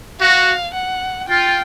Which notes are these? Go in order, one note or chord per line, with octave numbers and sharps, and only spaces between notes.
F#4 F5
F#5
F4 G5